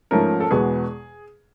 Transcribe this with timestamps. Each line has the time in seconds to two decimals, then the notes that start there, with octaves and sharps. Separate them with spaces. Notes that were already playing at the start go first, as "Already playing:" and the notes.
0.11 G#2 F3 A3 C#4 A#4
0.40 A4
0.51 E2 B2 G#3 B3 G#4